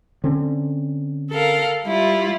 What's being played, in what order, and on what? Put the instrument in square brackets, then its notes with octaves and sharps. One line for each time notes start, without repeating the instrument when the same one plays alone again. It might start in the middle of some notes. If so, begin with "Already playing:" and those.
[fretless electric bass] D3 C4 C#4
[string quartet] A4 A#4 F5
G3 E4 F4